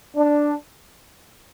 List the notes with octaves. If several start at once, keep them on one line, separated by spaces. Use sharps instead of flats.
D4